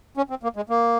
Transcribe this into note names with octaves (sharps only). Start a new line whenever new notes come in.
C#4
C4
A#3
G#3
A#3